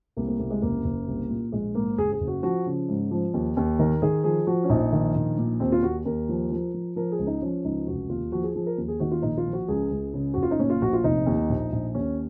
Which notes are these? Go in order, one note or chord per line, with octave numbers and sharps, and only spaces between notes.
C2 A#3
A#3
C2 A#3
G#3
F#1 A#3
F#1
C2
A#2
A#1 G#3
G#2 A#3
F#1 G#4
G#4
F#1
F#4
F3 F#4
C#3
G#2
F3
D#2
D#2
D#3 A#4
D#3 G#4
F3 G#4
F3 F#4
C#4
A#1 D#4
D#3
A#1
A#2
D#2 C4
F4
D#2 F#4
D#2 A#4
F3
F3
F3
F3 A#4
G#4
C#2
D#4
F3 C#4
C#2 D#4
F1 F#4
D#2 F4
F3 F#4
G#4
F3 G#4
A#4
D#2
G#4
D#3 F#4
F4
A#1 D#4
F4
F3
F#4
C#2 G#4
C#2
C#3
F#1 F#4
F4
D#4
A#2 C#4
F4
A#1 F#4
F4
F1 D#4
D#2
A#1
A#1
D#2 C#4